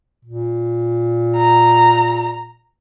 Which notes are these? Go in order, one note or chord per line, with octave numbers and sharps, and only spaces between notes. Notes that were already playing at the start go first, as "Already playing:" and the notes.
A#2
A#5